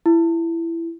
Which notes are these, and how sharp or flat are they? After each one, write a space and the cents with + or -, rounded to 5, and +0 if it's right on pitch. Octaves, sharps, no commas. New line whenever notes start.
E4 +15